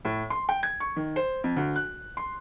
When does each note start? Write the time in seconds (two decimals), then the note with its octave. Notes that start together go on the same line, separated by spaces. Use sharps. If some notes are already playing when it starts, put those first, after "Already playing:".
0.05 A2
0.30 C6
0.49 G5
0.63 G#6
0.80 C#6
0.96 D#3
1.16 C5
1.44 F2
1.56 D2
1.76 F#6
2.17 C6